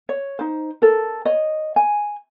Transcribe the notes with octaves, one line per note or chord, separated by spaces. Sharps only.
C#5
D#4 C5
A4 A#4
C#5 D#5
G#5